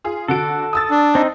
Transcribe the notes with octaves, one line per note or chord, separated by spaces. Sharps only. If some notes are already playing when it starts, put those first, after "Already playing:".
F4 G#4
D3 F#4 A4 D7
D#6 E6 A6
D4
C4 D#4